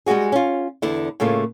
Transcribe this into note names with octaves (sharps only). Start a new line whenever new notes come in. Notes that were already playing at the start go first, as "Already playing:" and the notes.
G3 G#3 D4 F#4 G#4
C#4 F4
E2 D3 E4
A2 C#3 A3 A#3 F4